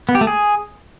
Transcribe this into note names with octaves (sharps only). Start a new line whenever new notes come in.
B3
G4
A3
G#4